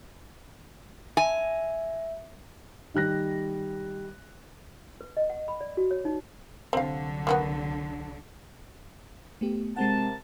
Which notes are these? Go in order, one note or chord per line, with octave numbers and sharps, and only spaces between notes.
E5 G#5
D#3 G3 F#6 A#6
B4
D#5
F#5
B5
D5
F#4
C#5
D#4
C2 D3 F#3 C4 F5
A#3 B3 F#4
A3 B3 G4
C3 G#3 C4 A#4 F#5 A5